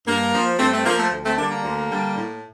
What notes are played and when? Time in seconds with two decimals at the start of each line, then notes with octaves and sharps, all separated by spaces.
0.07 G2 A#3
0.33 F3
0.59 G2 A3 C4
0.72 A3 C4
0.85 F3 A#3
0.98 A3
1.11 D2
1.24 A3 C4
1.38 D3 G3 A#3 D4
1.51 A#3
1.64 D2
1.90 D3 G3
2.16 A2